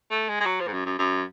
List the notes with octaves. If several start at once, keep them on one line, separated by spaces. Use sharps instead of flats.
A3
G#3
G#3
F#3
F3
G#2
F#2
F#2
F#2